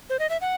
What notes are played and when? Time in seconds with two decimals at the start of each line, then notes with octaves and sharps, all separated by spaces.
0.10 C5
0.19 D#5
0.30 E5
0.41 F#5